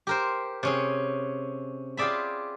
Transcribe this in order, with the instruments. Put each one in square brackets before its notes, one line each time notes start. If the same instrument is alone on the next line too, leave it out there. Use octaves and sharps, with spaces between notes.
[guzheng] G4 A#4 C5
C3 C#4 G#4
F4 G4 G#4 D5 E5 B5